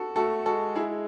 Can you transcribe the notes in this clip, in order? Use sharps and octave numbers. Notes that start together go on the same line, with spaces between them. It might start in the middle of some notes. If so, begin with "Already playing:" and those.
Already playing: F#4 A4
A3 F#4 A4
G#3 F#4 A4
E4 G#4